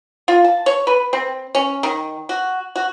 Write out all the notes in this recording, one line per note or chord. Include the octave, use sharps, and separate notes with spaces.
F4
A5
C#5
B4
C4
C#4
D#3
F#4
F#4